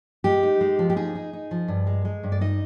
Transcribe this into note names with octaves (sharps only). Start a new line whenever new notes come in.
G#3 G4
D#4
G#3
F3
G4
D#4 G#4
D#4
D#4
F3
G2
G#3
G#3
G2
D5
D#4 D#5